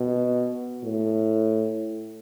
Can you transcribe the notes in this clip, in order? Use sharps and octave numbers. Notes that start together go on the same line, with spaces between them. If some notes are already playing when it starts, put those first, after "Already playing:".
Already playing: B2
A2